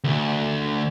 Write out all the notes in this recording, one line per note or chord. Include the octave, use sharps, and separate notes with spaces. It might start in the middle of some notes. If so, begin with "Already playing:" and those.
D2